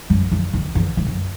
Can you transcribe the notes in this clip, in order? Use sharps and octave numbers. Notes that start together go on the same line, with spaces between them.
F#2
F2
E2
E2
F2
F#2